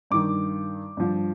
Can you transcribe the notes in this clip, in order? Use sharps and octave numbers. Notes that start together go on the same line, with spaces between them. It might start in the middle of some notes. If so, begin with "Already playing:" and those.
G2 D#3 D6
G2 F3